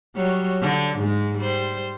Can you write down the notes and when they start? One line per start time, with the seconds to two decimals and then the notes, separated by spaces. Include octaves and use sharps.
0.16 F#3 G3 C#5
0.62 D3
0.99 G#2 G#3
1.37 G3 C5